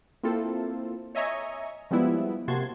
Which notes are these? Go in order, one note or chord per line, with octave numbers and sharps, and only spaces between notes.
A#3 C4 E4 F4 A4
C#5 D#5 E5 G#5 A#5 C#6
F3 G3 G#3 B3 E4
C3 A#3 F#4 A5 C6 G#6